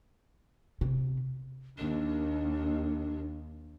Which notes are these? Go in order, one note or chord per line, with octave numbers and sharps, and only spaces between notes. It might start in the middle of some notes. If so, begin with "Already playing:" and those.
C3
D#2 D4